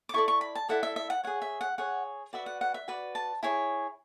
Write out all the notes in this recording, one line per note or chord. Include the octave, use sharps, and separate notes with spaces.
D6
E4 A4 D5 C#6
C#6
B5
A5
E4 A4 D5 F#5
E5
E5
F#5
G#4 C#5 F#5
E5
F#5
G#4 C#5 F#5
F#4 B4 D5 E5
F#5
F#5
E5
F#4 B4 D5
A5
E4 G#4 C#5